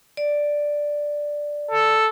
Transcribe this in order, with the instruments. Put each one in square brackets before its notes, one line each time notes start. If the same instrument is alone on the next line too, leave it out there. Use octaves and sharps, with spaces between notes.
[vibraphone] D5
[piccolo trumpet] A4